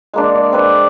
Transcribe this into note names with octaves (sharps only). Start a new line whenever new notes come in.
G#3 A#3 D4
D5
C4 B4 D5